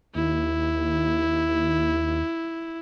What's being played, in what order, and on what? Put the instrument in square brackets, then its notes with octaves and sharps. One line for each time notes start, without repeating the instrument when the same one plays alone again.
[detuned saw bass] D#2 [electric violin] E4